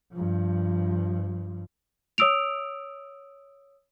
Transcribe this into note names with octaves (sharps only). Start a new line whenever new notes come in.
G2 F3
C#5 D#6 E6 D7 F7